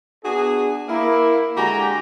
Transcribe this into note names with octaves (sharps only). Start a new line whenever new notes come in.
B3 D4 F#4 G#4
A#3 E4
D3 G#3 F#4 G4 G#5 A#5